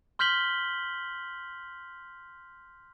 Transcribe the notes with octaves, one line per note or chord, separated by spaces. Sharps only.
C6 F6 G6 B6 F#7 G7